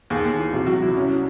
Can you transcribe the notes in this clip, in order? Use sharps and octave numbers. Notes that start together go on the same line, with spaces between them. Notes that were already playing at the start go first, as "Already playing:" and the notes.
D#2 G#4
D#2
E3
C3 F#4
F#3 F#4
F#3 E4
C2 C#4